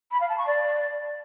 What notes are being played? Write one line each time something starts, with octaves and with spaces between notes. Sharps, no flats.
B5
F5
A5
C#6
D5